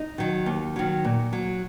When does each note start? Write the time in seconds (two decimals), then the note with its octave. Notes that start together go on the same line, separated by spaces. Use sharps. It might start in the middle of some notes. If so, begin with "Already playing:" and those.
Already playing: D#4
0.18 D#3 F#3
0.46 D#2
0.76 D#3 F#3
1.04 A#2
1.33 F#3